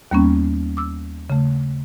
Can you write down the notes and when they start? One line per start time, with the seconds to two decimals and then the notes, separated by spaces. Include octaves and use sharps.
0.11 D#2 G3 A#3 B3 C#4
0.77 D6 E6
1.30 C#3 A3